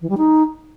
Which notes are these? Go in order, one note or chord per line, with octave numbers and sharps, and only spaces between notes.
E3
G3
D#4